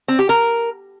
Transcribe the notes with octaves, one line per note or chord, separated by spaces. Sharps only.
C4
G4
A#4